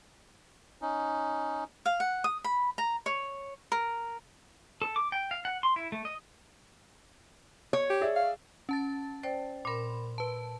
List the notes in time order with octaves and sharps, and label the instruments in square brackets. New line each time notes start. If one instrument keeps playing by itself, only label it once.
[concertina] C#4 D#4
[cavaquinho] F5
F#5
D#6
B5
A#5
C#5
A#4
[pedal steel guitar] A4
D6
G5
F5
F#5
C6
E4
A3
D#5
[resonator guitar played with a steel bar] C#5
[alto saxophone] G4
[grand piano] G#4 D5 E5
[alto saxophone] F5
[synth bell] C#4 A5 A6
[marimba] C5 D5 G5
[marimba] A#2 A#4 [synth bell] B5 C6
[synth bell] B4 A5